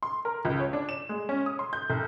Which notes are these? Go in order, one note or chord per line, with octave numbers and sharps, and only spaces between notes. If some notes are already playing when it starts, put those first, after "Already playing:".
C6
A#4
C#2
C#5
D4
E7
G#3
C#4
D#6
C6
G6
C2